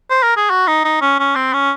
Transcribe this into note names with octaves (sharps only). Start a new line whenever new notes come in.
C5
A#4
G#4
F#4
D#4
D#4
C#4
C#4
C4
C#4